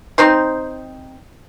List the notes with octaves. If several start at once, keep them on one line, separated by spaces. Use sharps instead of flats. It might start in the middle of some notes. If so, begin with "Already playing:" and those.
C4 D#4 C5 C6